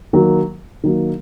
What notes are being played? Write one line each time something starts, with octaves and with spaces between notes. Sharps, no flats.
D#3 F#3 A#3
D#3 F#3 A#3